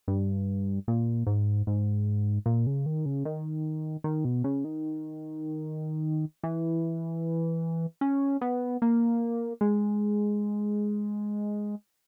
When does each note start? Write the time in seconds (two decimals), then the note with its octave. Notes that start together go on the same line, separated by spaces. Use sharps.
0.08 G2
0.88 A#2
1.27 G#2
1.67 G#2
2.46 A#2
2.66 C#3
2.86 D#3
3.06 C#3
3.25 D#3
4.04 D#3
4.25 B2
4.44 C#3
4.65 D#3
6.43 E3
8.01 C#4
8.41 B3
8.82 A#3
9.61 G#3